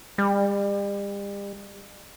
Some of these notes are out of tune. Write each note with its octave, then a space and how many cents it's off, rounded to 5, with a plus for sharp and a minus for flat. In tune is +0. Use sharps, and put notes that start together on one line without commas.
G3 +40